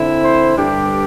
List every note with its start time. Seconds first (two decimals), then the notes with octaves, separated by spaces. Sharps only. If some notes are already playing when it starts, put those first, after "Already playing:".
Already playing: D3 C4 E4
0.23 C5
0.56 G2 D3 G3 D4 G4